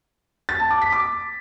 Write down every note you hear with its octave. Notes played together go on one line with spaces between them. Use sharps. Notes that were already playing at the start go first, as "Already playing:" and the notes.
A6
A5
D6
B6
D6